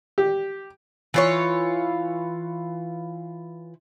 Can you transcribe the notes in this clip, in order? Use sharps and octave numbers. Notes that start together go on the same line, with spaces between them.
G4
E3 F4 C#5